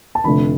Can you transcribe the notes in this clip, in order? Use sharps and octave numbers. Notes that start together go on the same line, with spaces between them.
A5
F1 F2 D3 A3 D4 B5